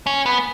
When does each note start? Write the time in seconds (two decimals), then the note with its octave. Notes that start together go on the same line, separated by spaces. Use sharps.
0.07 C#4
0.26 B3